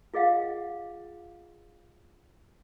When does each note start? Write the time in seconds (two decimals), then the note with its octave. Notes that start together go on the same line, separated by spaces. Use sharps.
0.14 F4 G#4 D#5 F5 F#5